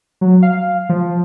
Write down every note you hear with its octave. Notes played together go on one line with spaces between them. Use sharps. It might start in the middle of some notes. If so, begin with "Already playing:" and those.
F#3
F5
F3